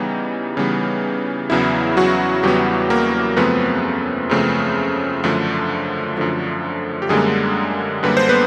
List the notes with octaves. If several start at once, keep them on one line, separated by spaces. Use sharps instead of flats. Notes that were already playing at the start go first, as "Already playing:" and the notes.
Already playing: C#3 E3 G3 B3 D#4
C#3 E3 G3 B3
E2 C#3 F#3 B3 E4
F#3 F#4
E2 C#3 F#3 G3 B3 G4
A#3 A#4
F#2 C#3 F3 A3 B3 C4 B4
F#2 C#3 F3 A3 C4
F#2 D3 F3 A3
F#2 D3 F3 A3
G4
F#2 D3 G3 G#3 A#3 G#4
F#2 D3 G3 A#3 B4
C5
B3 B4